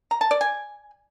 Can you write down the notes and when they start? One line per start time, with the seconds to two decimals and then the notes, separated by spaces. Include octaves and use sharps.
0.11 A#5
0.21 A5
0.31 D5
0.41 G#5